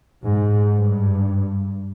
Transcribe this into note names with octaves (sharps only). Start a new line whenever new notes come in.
G#2
G2